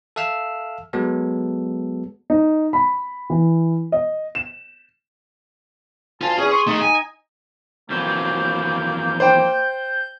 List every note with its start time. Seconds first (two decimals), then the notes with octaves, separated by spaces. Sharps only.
0.16 A4 E5 F5 E6 F6
0.93 F#3 G#3 B3 A4
2.30 D#4
2.73 B5
3.30 E3
3.92 D#5
4.35 E7
6.21 D2 F4 G#5 A5
6.38 E2 C#4 G#4
6.51 C6 C#6
6.67 A3 D#4 G#4 D#5
6.82 G#5
7.90 F2 E3 F#3 A#3 G6
9.20 C5 G5